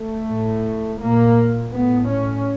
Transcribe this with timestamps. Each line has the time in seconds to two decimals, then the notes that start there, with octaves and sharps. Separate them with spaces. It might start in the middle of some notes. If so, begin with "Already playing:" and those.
Already playing: A3
0.29 A2
1.01 A#2 A#3
1.73 A2 B3
2.09 C#4